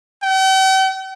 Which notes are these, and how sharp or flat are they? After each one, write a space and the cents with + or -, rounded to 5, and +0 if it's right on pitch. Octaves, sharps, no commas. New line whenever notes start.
G5 -45